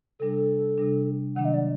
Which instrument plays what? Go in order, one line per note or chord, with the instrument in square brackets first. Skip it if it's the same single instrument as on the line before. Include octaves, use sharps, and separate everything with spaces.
[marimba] C3 G3 D4 [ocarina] A4
[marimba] C3 G3 D4
[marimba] C3 D#3 F#3 A#3 D4 [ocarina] F#5
[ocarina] D#5
D5